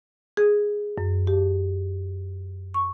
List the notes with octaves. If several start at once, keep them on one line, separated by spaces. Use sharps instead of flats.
G#4
F#2
G4
C#6